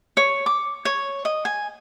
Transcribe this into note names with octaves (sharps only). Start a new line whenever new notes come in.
C#5
D6
C#5
D#5
G#5